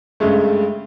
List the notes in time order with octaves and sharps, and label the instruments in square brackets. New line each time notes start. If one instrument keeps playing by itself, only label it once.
[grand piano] G2 C#3 G#3 A3